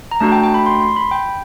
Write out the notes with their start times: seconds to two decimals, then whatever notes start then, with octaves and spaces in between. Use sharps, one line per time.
0.11 A#5
0.20 A3 D4 F#4 A5
0.32 G5
0.44 G5
0.54 B5
0.66 C6
0.81 C6
0.96 B5
1.11 G5